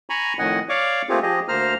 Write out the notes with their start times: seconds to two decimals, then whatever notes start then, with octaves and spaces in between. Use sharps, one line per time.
0.10 G#5 A#5 B5 C#6
0.39 F2 A2 D#3 D#5 F#5 G#5
0.69 C#5 D5 F5 C#6 D6
1.09 A3 A#3 C4 F4 G4 G#4
1.22 F3 G4 G#4 D#5
1.48 D2 A#3 C5 A#5 F6